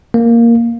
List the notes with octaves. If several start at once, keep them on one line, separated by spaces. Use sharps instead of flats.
A#3